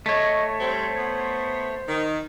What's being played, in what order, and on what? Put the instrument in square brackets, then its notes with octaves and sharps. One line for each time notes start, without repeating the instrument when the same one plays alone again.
[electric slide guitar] A3 C#5 [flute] D#5
[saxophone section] G3 C4 [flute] C5
[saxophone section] B3
D#3